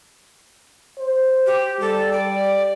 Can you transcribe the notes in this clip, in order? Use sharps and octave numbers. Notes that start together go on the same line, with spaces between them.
C5
G4
G3 A4
D5